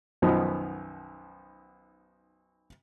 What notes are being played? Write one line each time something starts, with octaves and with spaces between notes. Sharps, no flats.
B1 F#2 D#3 F3 B3 D#5